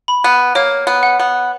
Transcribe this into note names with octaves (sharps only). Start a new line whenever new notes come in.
B5
B3
A#3 C#5
B3
F#5
B3